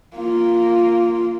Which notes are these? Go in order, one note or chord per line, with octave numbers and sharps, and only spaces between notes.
A#3 F4